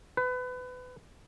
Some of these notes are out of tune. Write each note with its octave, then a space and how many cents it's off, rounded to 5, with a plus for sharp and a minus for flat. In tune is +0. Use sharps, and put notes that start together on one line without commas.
B4 +25